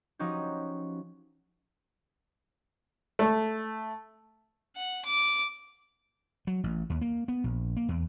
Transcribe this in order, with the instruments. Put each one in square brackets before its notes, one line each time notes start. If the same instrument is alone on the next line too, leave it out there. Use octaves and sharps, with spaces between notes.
[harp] F3 C#4 D#4 F#4 G4
[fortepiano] A3
[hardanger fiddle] F#5
D6
[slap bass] F#3
A1
D#2
A#3
B3
A#1
A#3
E2